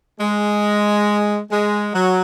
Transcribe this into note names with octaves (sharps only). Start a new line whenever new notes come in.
G#3
G#3
F#3